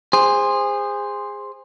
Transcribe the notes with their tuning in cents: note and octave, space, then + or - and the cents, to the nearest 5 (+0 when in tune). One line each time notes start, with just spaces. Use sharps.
G#4 -25 C5 +0